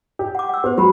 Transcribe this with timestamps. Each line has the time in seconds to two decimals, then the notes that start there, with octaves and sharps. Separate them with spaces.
0.19 G4
0.35 F#5 D6
0.49 F#5 E6
0.64 B3 G4 C5
0.78 F#3 G4 B5